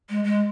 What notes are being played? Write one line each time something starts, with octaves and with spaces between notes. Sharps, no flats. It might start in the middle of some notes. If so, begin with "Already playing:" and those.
G#3
G#3